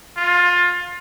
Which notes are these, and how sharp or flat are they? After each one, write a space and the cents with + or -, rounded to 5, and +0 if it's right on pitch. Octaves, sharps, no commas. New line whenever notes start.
F4 +20